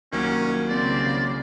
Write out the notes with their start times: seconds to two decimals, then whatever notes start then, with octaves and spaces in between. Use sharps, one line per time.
0.12 C2 D#3 F#3 A#3 C#4
0.69 C#3 C4 D5